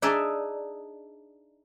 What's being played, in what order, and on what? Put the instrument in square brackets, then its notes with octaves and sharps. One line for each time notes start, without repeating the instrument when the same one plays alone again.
[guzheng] D4 D#4 G#4 D5 E5